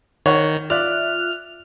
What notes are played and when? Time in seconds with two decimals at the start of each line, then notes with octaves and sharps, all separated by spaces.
0.26 D#3 C#5 F#5 C#6
0.70 F4 D5 E5 F6 F#6